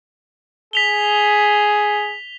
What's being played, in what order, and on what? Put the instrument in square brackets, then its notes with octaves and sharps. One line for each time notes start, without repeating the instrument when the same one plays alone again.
[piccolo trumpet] G#4 [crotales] B6 F7 G7